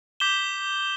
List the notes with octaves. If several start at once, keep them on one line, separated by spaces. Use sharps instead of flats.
D6 G6 B6 E7 G7